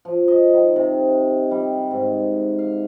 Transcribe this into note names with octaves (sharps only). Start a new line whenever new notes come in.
F3
D#5
D#3
C3
G3
G#2
F5